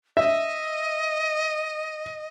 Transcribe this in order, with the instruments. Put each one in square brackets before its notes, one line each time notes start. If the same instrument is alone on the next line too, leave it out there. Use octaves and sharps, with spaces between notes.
[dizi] D#5 [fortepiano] E5